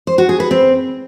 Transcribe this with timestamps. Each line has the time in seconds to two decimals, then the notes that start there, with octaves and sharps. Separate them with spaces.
0.07 C5
0.18 F#4
0.29 G#4
0.40 B4
0.51 C4